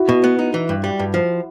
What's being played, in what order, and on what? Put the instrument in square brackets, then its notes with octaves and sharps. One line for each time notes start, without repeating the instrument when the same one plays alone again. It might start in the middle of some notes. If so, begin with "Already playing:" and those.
Already playing: [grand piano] E4 F#4
[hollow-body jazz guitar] B2
B3
D#4
E3
G2
G3
G2
F3